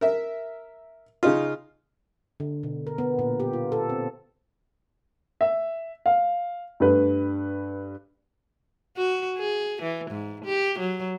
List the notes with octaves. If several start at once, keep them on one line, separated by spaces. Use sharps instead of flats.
A#4 E5
C#3 D#4 F4
D3
B2
A#4
B3
A#2
G4
F4
A4
C4
E5
F5
G2 A3 B4
F#4
G#4
E3
G#2
G4
F#3